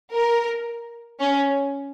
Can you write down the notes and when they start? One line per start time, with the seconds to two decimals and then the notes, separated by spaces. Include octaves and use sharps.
0.12 A#4
1.20 C#4